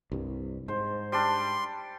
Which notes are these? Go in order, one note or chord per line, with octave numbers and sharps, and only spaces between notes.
C2 G2
G#2 C5
G3 D4 C6